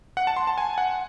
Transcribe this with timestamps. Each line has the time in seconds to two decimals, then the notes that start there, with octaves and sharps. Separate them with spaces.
0.17 F#5
0.27 A5
0.37 C6
0.47 A5
0.58 G#5
0.78 F#5